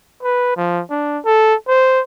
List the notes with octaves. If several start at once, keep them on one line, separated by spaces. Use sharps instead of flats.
B4
F3
D4
A4
C5